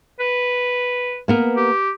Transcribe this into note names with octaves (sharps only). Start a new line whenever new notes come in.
B4
A#3 B3 A#4
G4